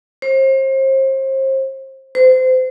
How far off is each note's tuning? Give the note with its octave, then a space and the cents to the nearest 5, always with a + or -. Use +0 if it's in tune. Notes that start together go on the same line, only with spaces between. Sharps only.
C5 +35
C5 -25